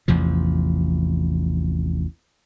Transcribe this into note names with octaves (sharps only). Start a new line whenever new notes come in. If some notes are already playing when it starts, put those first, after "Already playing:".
A1 E2 C3 F3